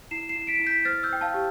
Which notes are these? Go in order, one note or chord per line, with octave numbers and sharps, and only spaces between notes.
E4 C7 E7
C7 E7
E4
B6 D7
E4
G6 B6
C5 F6 A6
E6 G6
C5 G5
F5 A5
G4